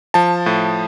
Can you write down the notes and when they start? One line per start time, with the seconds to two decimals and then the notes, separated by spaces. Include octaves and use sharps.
0.14 F3 A5
0.46 A2